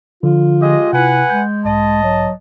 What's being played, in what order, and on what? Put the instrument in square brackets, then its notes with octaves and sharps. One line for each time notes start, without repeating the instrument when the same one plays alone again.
[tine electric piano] D3 F3 [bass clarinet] F4
[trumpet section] G#3 G4 D#5
[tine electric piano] C3 E4 [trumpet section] B4 F#5 G#5
[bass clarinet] G#3 [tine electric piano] G6
[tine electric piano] B1 G#2 [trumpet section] D#5 A5
[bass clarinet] F#3